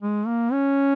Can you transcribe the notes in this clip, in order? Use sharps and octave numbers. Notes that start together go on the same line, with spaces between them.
G#3
A#3
C#4